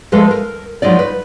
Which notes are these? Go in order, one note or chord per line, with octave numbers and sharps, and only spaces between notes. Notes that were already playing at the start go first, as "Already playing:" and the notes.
F3 G#3 A3 A4 B4 F5
A#4
F3 F#3 G#3 D#4 D5
B4